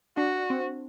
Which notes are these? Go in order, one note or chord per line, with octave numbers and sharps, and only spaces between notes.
D4 F#4
C4